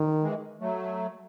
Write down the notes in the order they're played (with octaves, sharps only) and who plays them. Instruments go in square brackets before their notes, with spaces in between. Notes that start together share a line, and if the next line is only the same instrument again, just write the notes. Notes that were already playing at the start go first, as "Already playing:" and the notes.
Already playing: [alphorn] D#3
[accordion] E3 G#3
F#3 A3